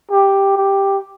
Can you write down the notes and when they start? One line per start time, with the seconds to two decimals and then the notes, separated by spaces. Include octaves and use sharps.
0.11 G4
0.57 G4